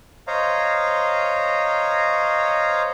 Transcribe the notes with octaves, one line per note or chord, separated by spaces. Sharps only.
C5 C#5 D#5 F5 A#5